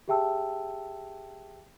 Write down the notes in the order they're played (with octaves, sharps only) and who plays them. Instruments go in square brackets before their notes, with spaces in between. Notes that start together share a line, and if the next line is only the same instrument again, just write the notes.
[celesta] G4 G#4 E5 G5 A5 E6